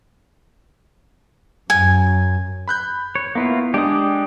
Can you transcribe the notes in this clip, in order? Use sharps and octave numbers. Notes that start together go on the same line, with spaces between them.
F#2 G#5
B5 F#6 G6
C#5
A#3 B3 E4 F4
G#3 D4 G4 G#4 D#6